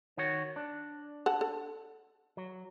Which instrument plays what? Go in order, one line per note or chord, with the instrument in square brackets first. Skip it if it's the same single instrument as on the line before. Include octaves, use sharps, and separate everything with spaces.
[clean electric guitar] D#3 F#4 C#5
D4
[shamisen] A4 F#5 A5
A4
[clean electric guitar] F#3